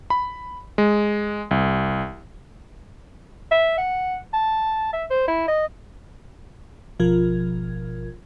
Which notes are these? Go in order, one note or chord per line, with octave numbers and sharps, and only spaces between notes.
B5
G#3
C2
E5
F#5
A5
E5
C5
E4
D#5
G#1 B2 F3 F4 A#4 G#6